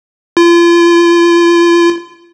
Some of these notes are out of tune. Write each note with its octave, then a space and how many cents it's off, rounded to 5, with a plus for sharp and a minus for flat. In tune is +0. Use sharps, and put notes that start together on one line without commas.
F4 -35